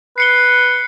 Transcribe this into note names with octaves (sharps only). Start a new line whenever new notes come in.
B4 C7 C#7 G7